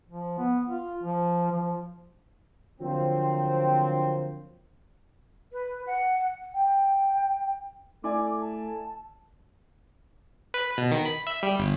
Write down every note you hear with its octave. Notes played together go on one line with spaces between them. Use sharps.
F3
B3
F4
F3
F3
D3 F3 F#3 A#3 C4
B4
F#5
G5
A3 E4 D5 G#5 D6
A5
B4
B2
D#3
B5
E5
G3
G1